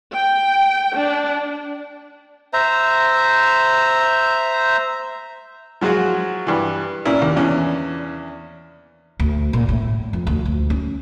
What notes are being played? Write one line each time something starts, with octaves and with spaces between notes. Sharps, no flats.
G5
D4
C5 E5 A#5
F3 F#3 G#3 F4 F#4
G2 E3
A#2 C#4 E4
D#2
E2 C#4 D4
D2
A#2
A2
F2
D2
D2
C#4